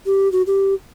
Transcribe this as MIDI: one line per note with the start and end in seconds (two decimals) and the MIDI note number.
0.06 0.30 67
0.32 0.42 66
0.47 0.74 67